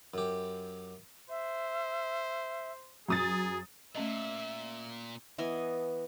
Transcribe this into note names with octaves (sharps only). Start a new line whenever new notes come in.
F#2 G4
C5 E5
F#2 G#4 D#6 A6
A#2 A3 C#4 D#5 E5
E3 B3 D#5 G#5